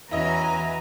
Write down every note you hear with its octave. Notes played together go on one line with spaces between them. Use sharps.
E2 C#4 E4 F#4 B4 D#5 G#5 A#5